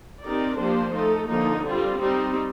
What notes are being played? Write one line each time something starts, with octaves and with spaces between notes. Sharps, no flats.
C4 D#4 G4 A#4 D5
F3 A#3 D4 G4 C5
A3 D#4 A4
D3 F3 A#3 D#4
G3 C4 F4
G3 C4 D#4